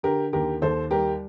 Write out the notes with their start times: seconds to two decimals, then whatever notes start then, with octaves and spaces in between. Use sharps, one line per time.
0.03 D3 G4 A#4
0.33 D#2 G4 A#4
0.62 D#2 A4 C5
0.91 G3 G4 A#4